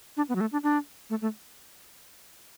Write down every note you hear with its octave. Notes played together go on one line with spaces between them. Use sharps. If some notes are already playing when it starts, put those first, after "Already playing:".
D4
B3
F#3
A3
D4
D4
A3
A3